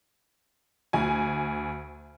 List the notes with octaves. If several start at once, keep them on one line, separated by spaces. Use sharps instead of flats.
D2 G#5